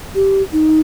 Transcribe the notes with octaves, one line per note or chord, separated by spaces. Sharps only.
G4
D#4